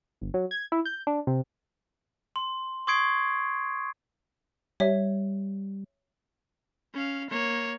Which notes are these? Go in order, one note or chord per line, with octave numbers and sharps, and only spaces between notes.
G1
F#3
G#6
E4
G6
D4
C3
C6
C6 C#6 D#6 G#6 C7 D7
G3 C#5 E5
C#4 F5
A#3 C#5